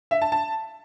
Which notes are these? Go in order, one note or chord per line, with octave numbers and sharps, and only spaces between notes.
E5
A5
A5